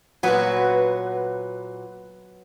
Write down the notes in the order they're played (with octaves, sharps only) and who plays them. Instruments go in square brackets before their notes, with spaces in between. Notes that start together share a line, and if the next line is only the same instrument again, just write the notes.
[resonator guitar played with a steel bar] A#2 F#4 [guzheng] F#3 B3 B4